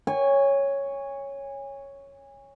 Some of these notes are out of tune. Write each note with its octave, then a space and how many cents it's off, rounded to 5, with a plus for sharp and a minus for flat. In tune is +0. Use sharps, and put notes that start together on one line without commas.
C#5 +0 G#5 -30